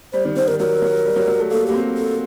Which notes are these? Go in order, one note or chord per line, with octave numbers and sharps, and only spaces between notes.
G3 C5
D#3
D#3 C5
D#3 A#4
F#3 A#4
F#3
G3
F#3
F#3
A3
A#3 A4
A#3 G4
C4
A4